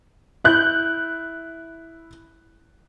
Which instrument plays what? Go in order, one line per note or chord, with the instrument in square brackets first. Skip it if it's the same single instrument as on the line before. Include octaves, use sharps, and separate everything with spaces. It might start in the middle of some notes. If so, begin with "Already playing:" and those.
[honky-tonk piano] E4 F#6 G6